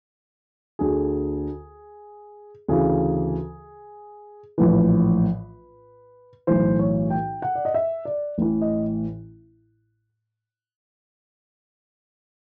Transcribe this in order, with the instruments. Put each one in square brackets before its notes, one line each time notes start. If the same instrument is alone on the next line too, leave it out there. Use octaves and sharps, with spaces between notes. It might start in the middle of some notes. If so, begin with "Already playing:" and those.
[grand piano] D2 D3 G#4
D2 C#3 E3 G#4
A#1 A2 E3 B4
B1 A2 E3 C5
C#5
G5
F#5
D5
D#5
E5
D5
A1 A2 E3
D#5